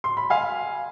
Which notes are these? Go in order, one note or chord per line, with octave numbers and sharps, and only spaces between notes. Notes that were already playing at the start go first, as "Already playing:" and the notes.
C6
B5
F5 G#5